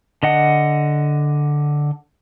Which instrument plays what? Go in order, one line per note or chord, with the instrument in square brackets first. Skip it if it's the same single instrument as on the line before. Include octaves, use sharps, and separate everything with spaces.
[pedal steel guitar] D3 D#5 F#5